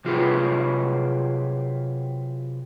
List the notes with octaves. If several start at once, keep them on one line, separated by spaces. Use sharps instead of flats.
C3 F#3 F4 G4 G#4 B4